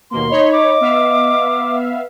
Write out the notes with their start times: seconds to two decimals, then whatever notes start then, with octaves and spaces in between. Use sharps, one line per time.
0.11 D#2 B2 A#3 C6
0.30 D#4 C#5 D#5 B5
0.52 D6
0.81 B3 E5 F5